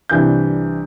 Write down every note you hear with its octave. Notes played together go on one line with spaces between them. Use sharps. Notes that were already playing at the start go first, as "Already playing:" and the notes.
C2 E3 D4 G6